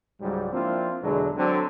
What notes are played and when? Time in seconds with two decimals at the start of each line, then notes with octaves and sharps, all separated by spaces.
0.21 C#2 G#2 F#3 G3
0.53 F3 A#3 C4 D4 E4 F4
1.02 E2 B2 D3 F#3 G#3
1.37 D3 F#3 C4